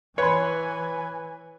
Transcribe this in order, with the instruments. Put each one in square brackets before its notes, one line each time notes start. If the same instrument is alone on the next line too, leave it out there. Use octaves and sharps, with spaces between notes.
[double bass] E3 [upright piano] B4 [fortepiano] C#5 C6 [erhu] G#5